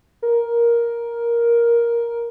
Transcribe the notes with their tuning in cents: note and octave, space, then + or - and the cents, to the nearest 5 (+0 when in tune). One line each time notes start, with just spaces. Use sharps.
A#4 +10